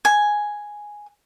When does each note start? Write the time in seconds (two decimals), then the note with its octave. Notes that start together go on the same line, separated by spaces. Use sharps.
0.05 G#5